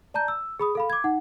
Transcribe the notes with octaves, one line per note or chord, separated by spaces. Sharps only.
D5 A5 A#5 G6
E6
G#4 B5 D#6
A4 F5 B5
D6 G#6
D#4 F#5